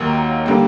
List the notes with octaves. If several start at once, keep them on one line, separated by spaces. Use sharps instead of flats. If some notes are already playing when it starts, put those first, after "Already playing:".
Already playing: D#2 D#3 F#3 A#3
D3 G3 A#3